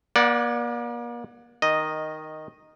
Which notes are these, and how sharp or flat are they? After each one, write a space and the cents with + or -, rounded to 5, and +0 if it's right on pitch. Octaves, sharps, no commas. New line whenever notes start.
A#3 +40 D5 +0 F#5 +0
D#3 +0 D#5 -5